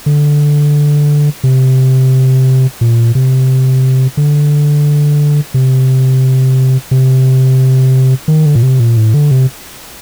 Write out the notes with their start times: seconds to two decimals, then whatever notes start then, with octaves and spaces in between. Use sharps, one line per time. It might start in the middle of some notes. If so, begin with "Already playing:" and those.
0.06 D3
1.44 C3
2.81 A#2
3.15 C3
4.17 D3
5.54 C3
6.91 C3
8.28 D#3
8.46 D3
8.55 A#2
8.63 C3
8.80 A#2
8.97 A2
9.14 D3
9.31 C3